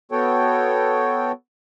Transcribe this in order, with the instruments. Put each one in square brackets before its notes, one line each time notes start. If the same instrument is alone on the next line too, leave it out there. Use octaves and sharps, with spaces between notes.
[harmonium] B3 F#4 A4 C#5 G5